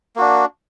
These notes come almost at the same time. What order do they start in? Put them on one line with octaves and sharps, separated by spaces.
A#3 F#4 D4